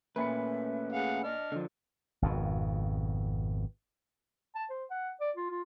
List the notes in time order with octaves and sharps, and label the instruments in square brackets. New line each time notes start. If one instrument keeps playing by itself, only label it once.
[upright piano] A#2 B5 C#7 [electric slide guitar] A3 C#4 B4 [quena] E5
[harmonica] G#4 F5 F#5
[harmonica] D4 F6 [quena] D#5
[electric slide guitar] D3 F3
[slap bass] G#1 F2 B2
[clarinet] A5
C5
F#5
D5
F4
F4